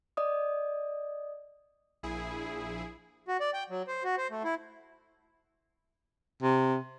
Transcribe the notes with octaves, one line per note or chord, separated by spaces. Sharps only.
D5 D#5 D#6
A#1 E4 G#4
F#4
D5
G5
F#3
C5
F#4
C5
A3
E4
C3